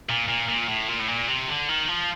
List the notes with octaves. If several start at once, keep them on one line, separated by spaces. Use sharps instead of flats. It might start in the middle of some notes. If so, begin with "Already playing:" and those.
A#2
A#2
A#2
A2
A#2
A2
A#2
C3
D3
D#3
F3